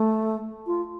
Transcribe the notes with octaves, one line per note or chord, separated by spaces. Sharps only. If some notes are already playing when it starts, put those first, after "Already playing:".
Already playing: A3
F4